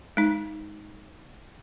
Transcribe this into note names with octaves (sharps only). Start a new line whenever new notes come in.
G#3 D#4